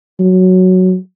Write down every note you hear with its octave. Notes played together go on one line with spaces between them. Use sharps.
F#3